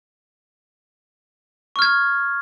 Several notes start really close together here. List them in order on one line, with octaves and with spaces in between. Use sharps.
C#6 F6 G#6